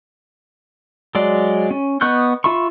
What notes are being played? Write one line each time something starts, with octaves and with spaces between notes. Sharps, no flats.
F#3 G#3 D5
C#4
B3 D#5 C#6 F#6 G6
F4 E5 B5 C#6